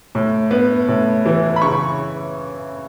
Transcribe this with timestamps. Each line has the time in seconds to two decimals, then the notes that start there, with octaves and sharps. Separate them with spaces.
0.15 A2
0.51 B3
0.88 A2
1.26 E3
1.56 B5
1.62 C#3 C#6